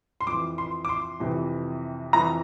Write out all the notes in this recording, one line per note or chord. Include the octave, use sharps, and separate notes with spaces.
C6
F2 D6
E3
C6
D6
C6
F2 C3 E3
F2 E3 A#5